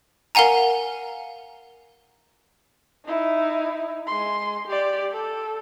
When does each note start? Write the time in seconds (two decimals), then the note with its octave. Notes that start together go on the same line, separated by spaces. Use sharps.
0.35 A#4 F5 F#5 G#5 A#5
3.05 D#4 E4
4.07 G#3 C6
4.67 G4 D5
5.12 A4